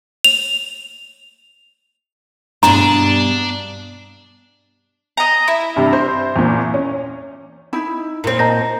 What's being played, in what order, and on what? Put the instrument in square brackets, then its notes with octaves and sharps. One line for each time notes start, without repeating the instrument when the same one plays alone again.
[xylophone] F7
[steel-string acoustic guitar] G2 B2 G#4 [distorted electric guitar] D4 [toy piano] A#5
[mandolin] D#5 A#5
E4
[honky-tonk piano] G2 C3
C5
E2 A#2
C#4
[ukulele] D#4 E4 B5
[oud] A#2 C4
[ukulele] D#5 A5 [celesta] A#5 G6 A#6